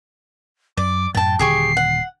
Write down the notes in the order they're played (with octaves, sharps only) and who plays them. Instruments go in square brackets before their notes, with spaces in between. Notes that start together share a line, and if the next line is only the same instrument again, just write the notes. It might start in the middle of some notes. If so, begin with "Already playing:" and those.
[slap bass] F#2 [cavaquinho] D5 [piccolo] D6
[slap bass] F#2 A2 F#3 [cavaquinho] G5 A5 [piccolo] A6
[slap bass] D#1 D3 [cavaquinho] G4 G#4 C#6 [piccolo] C7
[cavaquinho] F#5